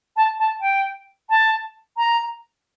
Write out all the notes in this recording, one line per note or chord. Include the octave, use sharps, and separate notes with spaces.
A5
A5
G5
A5
A#5